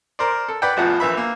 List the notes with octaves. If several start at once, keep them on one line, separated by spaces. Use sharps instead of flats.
A#4 C5 D5
A4
B4 D5 F#5 G5
A1 E2 F3 F#5
A#1 E3 E5 B5
A#3